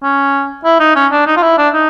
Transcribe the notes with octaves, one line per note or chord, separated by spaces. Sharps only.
C#4
E4
D#4
C#4
D4
D#4
F4
E4
D4
D#4